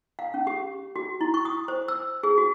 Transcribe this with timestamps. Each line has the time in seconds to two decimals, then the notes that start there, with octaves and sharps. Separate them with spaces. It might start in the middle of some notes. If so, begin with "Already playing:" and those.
0.19 F5
0.34 C#4
0.47 G4
0.96 F#4
1.21 E4
1.34 C#6
1.45 D#6
1.68 C5
1.88 E6
2.23 G#4
2.38 F#4